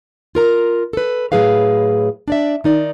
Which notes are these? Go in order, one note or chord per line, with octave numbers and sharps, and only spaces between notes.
F4 A#4 A#5
A4 B4
A2 F#3 G#3 G#4 B4 F5
D4 D5 E5
D#3 D#4 D5